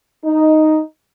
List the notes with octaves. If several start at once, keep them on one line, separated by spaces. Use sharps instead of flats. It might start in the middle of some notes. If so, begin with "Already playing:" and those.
D#4